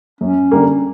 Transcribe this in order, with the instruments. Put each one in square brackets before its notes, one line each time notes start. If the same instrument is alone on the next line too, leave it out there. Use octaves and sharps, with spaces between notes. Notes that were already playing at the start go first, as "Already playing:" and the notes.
[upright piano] F#2 [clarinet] C#4
[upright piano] D3 G3 A#3